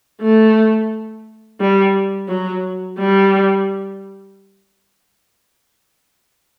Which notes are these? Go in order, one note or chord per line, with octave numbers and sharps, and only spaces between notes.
A3
G3
F#3
G3